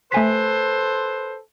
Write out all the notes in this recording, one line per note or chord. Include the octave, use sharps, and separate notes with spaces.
A3 A4 B4 C5 G#5 B6